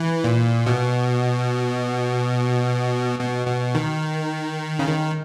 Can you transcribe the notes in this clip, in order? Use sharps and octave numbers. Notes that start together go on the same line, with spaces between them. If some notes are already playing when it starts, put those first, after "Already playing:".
Already playing: E3
A#2
B2
B2
B2
D#3
C#3
D#3